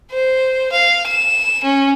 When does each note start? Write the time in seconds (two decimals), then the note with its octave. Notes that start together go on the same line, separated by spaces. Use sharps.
0.11 C5
0.71 F5
1.07 E7
1.63 C#4